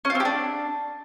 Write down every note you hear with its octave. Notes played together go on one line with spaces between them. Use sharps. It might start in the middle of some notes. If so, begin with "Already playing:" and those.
C#4
F4
C4
G4
D4